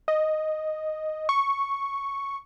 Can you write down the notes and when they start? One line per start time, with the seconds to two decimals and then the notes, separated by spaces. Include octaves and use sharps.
0.08 D#5
1.29 C#6